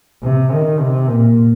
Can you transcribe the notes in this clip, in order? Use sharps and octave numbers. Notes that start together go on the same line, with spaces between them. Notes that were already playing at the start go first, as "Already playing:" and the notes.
C3
D#3
C3
A#2